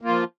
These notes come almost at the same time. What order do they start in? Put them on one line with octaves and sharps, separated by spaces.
A#3 F4 F3